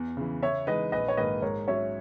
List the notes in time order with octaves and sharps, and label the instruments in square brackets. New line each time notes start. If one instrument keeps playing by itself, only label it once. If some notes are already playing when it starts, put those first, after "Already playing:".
Already playing: [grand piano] E2
C#3 E3
[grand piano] C#3 [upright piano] C#5 E5
[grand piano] E3 G#3 D#4 [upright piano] B4 D#5
[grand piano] A#1 [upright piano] B4 D#5
[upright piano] C#5
[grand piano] G#2 D#3 A#3 [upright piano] B4 D#5
[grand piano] G#2 [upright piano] A#4 C#5
[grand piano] F#3 C#4 [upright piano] C#5 E5